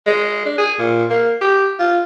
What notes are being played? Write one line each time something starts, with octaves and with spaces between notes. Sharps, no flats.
G#3
D4
G#4
A#2
A#3
G4
F4